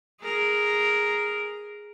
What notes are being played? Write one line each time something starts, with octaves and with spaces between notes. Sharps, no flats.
G#4 A#4